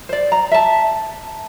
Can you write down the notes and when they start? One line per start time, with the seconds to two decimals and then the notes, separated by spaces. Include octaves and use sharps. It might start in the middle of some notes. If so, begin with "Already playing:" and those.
0.09 C5 D5
0.32 A#5
0.51 E5 A5